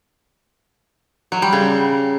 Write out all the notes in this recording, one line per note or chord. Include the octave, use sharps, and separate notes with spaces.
F#3
G3
C#3